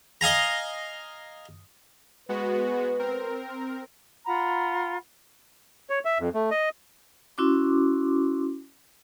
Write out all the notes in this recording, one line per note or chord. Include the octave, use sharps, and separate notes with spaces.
D#5 F5 G#5 A#5
G#3 B3 F#4 B4
C4 A#4
F4 F#5 A#5 B5
C#5
E5
F2
A3
D#5
C#4 E4 F#4 C6 D6